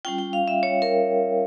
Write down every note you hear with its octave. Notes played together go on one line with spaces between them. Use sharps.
G3 C#4 F4 G5
G5
F5
E5
C#5
A#4